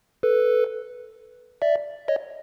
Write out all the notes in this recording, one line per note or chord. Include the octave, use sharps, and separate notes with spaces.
A4 B4
D5 E5
C#5 D#5